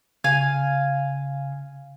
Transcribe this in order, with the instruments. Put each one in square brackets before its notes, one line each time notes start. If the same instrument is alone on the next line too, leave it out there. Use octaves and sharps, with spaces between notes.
[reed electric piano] C#3 [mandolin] F5 G#5